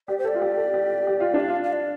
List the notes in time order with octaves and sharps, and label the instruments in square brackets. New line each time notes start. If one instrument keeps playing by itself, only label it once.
[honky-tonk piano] G4 [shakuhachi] D5
[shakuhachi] C5
[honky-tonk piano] A4 [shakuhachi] D5
[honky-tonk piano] F4
G4
A4
G4
G4
F4
D4
[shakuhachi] F5
[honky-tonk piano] F4
[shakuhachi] F5
D5